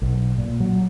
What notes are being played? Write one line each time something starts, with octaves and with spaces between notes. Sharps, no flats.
B1
A#2
F#3